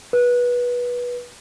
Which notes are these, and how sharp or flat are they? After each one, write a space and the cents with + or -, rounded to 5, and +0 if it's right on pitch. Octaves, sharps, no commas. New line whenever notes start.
B4 -20